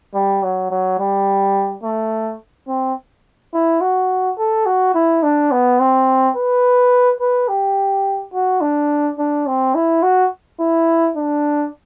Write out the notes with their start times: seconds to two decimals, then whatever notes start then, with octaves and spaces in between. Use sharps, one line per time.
0.15 G3
0.43 F#3
0.71 F#3
0.99 G3
1.84 A3
2.68 C4
3.54 E4
3.81 F#4
4.38 A4
4.66 F#4
4.95 E4
5.23 D4
5.52 B3
5.80 C4
6.36 B4
7.20 B4
7.48 G4
8.34 F#4
8.61 D4
9.19 D4
9.47 C4
9.75 E4
10.03 F#4
10.60 E4
11.17 D4